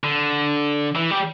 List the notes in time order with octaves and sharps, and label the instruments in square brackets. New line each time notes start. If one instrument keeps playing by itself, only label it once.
[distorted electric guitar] D3
E3
G3